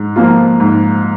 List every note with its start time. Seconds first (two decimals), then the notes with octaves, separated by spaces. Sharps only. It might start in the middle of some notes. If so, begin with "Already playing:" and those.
Already playing: G#2
0.16 F3 A#3 F4
0.60 G#2